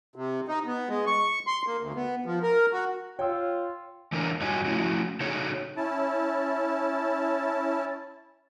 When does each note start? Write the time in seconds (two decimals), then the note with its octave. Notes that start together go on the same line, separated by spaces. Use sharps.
0.16 C3
0.48 D#4
0.66 B3
0.89 G#3
1.07 C#6
1.47 C6
1.67 A#3
1.80 D2
1.96 B3
2.26 F3
2.43 A#4
2.73 F#4
3.19 F4 C#5 G5 E6
4.12 E3 G#3 A3 D4 A#4 C#5
4.41 G2 D#3 F#4 C#5 D#5 G#5
4.66 F3 A3 C#4 E4 F#4
5.20 C#3 D#4 F#4 G#4 A4 C#5
5.77 C#4 E4 A5